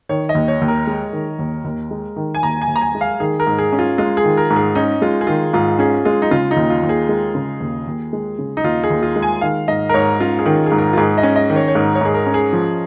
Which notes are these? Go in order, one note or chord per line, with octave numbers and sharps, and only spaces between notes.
D#3 C#5
D#5
D#2
C#5
D#2
A#4
G#3
D#3
D#2
D#2
G#3
D#3
G#5
D#2 A#5
G#5
D#2
A#5
G#5
G#3
F5
D#3 G#4
A#4
G#2
G#4
C#4
F4
G#3 F4
G#4
D#3
A#4
G#2
G#4
C#4 D#4
G#3 F4
G#4
D#3 F4
G#2 F4
C#4 G#4
G#3 F4
D#4
C#3 F4
D#4
D#2
F4
D#2
G#4
G#3
C#3
D#2
D#2
G#3
C#3
D#4
D#2 F4
G#4
D#2
F4
G#3
G#5
D#3 F5
G#2 D#5
A#4
G#2 C#5
C#4 F4
G#4
D#3
G#4
G#2
A#4
F4
G#2 G#4
D#5
C#4
D#5
D#3
C#5
C#5
G#2 A#4
C#5
G#2 G#4
A#4
C#4
G#4
F3